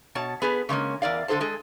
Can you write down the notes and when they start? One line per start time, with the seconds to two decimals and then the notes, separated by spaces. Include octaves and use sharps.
0.15 B2 C#5 A5
0.42 B3 G#4 B4
0.69 C#3 G#3 A#3 C#4
1.02 E2 A#4 D5 F5
1.28 D3 F4 A4 C5 A5
1.40 G#3 G#4 A4